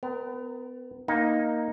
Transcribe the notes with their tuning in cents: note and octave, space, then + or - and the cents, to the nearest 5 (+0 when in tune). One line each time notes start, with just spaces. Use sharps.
B3 +30 A#4 +0
A#3 +0 D#4 +0